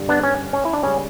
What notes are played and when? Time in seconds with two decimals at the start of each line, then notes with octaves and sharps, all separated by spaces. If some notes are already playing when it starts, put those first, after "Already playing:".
Already playing: G2 D3 G3
0.09 B3 D4
0.23 C#4
0.53 C#4
0.65 E4
0.73 D4
0.82 C#2 C#3 G3 C#4